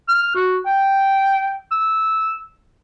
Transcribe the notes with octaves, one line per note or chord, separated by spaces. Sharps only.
F6
F#4
G5
E6